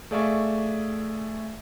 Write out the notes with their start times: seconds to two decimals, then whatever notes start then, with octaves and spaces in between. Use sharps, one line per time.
0.11 A3 G#4 D5 E5 F5 C#6